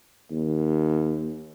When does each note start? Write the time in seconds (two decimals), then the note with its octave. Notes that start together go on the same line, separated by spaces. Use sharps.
0.31 D#2